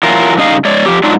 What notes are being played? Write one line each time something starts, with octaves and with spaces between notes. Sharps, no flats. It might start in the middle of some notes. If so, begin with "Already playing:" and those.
E3 F#3 F4 A#4
G2 C#3 D#4 D#5 F5
G#3 C#5 D5
F3 G4
G#2 F#3 D4 D#4 F4 D5